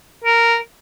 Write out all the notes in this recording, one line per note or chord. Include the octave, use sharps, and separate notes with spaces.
A#4